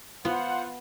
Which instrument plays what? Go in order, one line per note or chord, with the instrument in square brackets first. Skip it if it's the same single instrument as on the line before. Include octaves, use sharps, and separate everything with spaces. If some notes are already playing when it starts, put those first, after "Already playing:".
[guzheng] B3 [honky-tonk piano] F4 [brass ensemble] C5 F#5